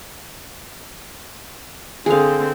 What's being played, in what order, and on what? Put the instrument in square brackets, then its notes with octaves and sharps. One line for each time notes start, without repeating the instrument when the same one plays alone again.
[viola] D3 C4 [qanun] G#4 F5